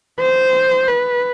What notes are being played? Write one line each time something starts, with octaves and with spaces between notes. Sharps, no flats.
C5
B4